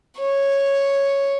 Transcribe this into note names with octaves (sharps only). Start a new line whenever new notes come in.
C#5